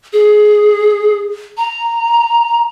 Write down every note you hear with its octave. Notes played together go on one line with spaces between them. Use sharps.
G#4
A#5